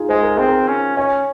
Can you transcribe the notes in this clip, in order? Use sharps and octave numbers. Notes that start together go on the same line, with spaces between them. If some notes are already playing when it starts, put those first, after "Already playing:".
Already playing: D#4 F4 G#4
G#3 C5
A#4
C4 G#4
A#4
C#4
C#4 C#5